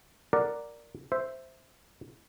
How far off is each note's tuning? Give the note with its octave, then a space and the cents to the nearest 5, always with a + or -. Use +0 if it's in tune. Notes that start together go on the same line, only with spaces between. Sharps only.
A#4 +0 D5 +0 F#5 +0
C5 +0 E5 +0